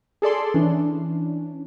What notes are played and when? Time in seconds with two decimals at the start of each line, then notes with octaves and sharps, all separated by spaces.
0.22 G#4 A4 D5 C6
0.54 E3 C#4 D4